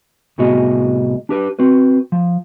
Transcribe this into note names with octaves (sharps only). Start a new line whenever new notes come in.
C2 A2 B3 F#4 G#4 D#5
D4 G4 B4
C4 F#4 B4
F3